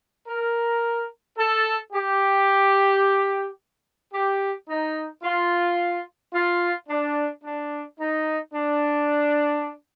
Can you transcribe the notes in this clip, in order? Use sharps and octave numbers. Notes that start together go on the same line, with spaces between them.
A#4
A4
G4
G4
D#4
F4
F4
D4
D4
D#4
D4